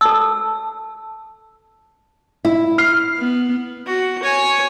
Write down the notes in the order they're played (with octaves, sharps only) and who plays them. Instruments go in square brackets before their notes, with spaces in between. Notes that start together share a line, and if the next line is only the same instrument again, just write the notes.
[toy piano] A4 E6 [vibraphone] A5
[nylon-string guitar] E4
[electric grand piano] F6 C7
[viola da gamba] B3
[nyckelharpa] F#4
C#5 G#5